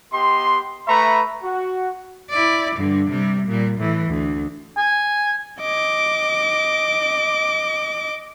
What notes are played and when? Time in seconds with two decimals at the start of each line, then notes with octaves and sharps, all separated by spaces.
0.13 B3 G4 D#5 C6
0.87 A3 B4 E5 A#5 B5 C#6
1.43 F#4
2.30 E4 D5
2.76 G2 D3
3.10 C3 G3
3.47 A#2 G3
3.79 A2 E3
4.09 D2
4.78 G#5
5.61 D#5 D6